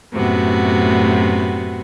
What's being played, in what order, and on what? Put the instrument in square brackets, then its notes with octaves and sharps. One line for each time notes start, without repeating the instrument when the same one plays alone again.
[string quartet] F#2 A2 C3 B3 F#4